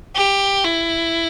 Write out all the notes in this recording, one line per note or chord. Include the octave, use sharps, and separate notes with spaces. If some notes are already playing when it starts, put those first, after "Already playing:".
G4
E4